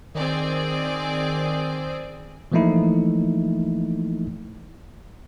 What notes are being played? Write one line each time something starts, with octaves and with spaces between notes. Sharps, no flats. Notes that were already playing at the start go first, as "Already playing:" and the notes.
D#3 C4 G#4 D5
E3 F3 A3 A#3 D#4 E4